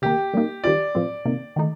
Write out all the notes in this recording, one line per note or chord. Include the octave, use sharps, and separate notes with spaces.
C3 D#3 A#3 G4
A#2 G3 A#3 D#4
D#3 G3 C4 F4 D5
A2 F3 C4 F4
C3 D#3 A#3
D#3 A3 D#4